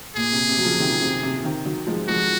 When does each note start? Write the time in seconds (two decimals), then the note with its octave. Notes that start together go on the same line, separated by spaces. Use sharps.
0.16 A#2 G#4
0.32 C3
0.49 C3
0.58 F#3
0.64 C#3 F3
0.80 C3 D#3
1.02 C3
1.23 C3
1.44 C3 D#3
1.65 D#3 F#3
1.87 F3 G#3
2.08 F3 G#3 F#4